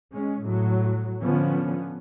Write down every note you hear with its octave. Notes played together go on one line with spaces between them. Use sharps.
G#3 C#4
A2 F#3
D3 F3 B3 C#4